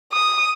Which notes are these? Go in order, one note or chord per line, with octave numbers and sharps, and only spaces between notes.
D#6